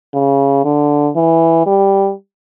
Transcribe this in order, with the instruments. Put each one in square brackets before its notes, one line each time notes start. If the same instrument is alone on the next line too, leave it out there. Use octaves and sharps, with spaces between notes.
[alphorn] C#3
D3
E3
G3